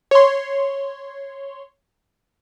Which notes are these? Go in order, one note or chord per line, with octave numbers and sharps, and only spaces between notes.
C#5 C6